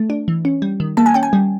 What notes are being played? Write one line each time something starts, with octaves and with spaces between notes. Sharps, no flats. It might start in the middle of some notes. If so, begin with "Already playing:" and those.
Already playing: A3
D4
E3
C#4
G3
D#3
A#3 A5
G#5
C#4 G5
G#5
G3